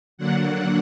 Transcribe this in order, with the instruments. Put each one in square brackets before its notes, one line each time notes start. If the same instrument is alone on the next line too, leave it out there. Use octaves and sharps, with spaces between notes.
[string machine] D3 F#3 A#3 D4 F#5